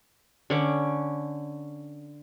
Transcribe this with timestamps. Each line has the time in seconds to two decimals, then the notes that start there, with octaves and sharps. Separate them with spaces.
0.50 D3 C#4 D6